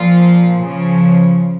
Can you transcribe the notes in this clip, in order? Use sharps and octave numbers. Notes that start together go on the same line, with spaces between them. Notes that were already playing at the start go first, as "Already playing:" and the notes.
Already playing: A#2 F3 F4
C#3 F3